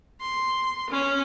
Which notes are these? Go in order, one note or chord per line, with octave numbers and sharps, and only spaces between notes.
C6
C#4